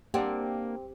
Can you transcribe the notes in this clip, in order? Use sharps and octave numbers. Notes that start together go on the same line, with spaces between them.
A#3 C4 D4 G4 D5 F#5